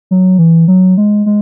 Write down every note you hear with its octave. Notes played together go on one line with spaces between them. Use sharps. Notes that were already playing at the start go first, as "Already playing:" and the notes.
F#3
E3
F#3
G#3
G#3